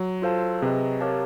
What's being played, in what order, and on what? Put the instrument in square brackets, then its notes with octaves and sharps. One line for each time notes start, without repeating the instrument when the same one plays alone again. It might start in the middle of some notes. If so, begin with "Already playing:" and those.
Already playing: [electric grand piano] F#3
[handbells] F4 A4 C5 F5 A5
[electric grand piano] C3 [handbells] G#4 B4 D#5
[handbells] G4 A#4 C#5 F5 A5